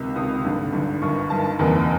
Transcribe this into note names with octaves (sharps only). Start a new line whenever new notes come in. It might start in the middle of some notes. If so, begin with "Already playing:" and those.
Already playing: C#2 C3 D#3 E6
C#2 C3 D#3 D#6
G#1 G2 D3
G#1 G2 D3
G1 G2 D#3 C#6
G1 G2 D#3 A5
F#1 E2 C3 D#3